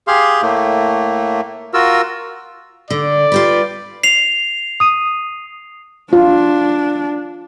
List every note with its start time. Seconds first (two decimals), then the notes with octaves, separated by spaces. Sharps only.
0.07 G4 G#4 F5 C6
0.41 A2 A3 A#3
1.74 F4 F#4 A#4 E6
2.90 D3 D5
3.32 F4 G4 B4
4.03 C7 F7
4.80 D#6 D#7
6.13 D4 F4